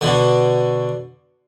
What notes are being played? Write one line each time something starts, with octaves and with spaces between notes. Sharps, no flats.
B2 D3